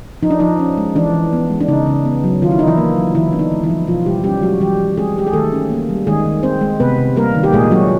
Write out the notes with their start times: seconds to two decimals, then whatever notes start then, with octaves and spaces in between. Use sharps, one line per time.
0.23 F3 D#4
0.30 D4
0.40 F3 D#4
0.60 C#4
0.77 G#3
0.96 E3 D4
1.14 E3
1.33 B3
1.50 G#3
1.61 D4
1.68 C#3 D#4
1.87 C#3
2.05 B3
2.24 F#3
2.42 D#3 F4
2.51 E4
2.59 D4 D#4
2.67 E3 E4
2.78 A#3
2.96 F#3
3.15 D3 E3 E4
3.33 B3 D4
3.39 D#4
3.52 G#3
3.63 E3 E4
3.70 F3
3.87 B2 F3 F4
4.06 B2 G3 G4
4.24 G3 C#4 G4
4.43 F#3 G#3 F#4
4.60 E3 G3 G4
4.79 E3
4.97 G#3 C4 G#4
5.16 G#3 G4
5.27 G#4
5.33 D#3 A3 A4
5.52 C#4
5.70 A#3
5.89 G3
6.07 D#3 G#3 G#4
6.25 D#3
6.43 C4 C5
6.61 G#3
6.80 C3 B3 B4
6.98 C3
7.16 G3 A#3 A#4
7.35 D#3
7.43 G4
7.53 A#2 G#3 G#4
7.71 F#3 D4 F#4